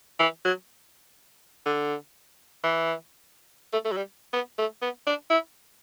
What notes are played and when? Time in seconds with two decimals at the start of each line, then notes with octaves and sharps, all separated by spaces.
0.20 E3
0.45 F#3
1.66 D3
2.63 E3
3.73 A3
3.85 A3
3.92 F#3
3.97 G3
4.33 B3
4.58 A3
4.82 B3
5.07 D4
5.30 E4